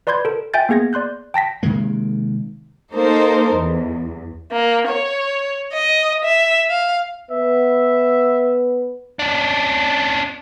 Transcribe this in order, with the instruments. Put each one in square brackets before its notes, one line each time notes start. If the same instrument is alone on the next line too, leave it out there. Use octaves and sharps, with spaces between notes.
[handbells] B4 D5 B5 C6 G6 G#6
A4 A#4
E5 G5 G#5 G6 A6
A#3 B3 G#4 G#6 A#6
D5 C6 F#6 G6
G5 A5 A#6 B6
[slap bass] C3 D#3 G#3 A#3
[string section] A#3 D#4 A4 A#4 C5
E2
[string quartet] A#3
C#5
D#5
E5
F5
[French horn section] B3 B4 [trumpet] E5
[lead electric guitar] C#4 D4